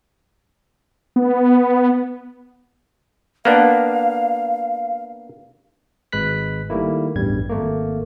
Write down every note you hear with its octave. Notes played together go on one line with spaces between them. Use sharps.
B3
A#3 B3 D4 F5
G#1 G#3 B4 F#6 B6
D#3 G3 A3 A#3 E4
A1 E2 G2 G3 G#6
G#1 A3 A#3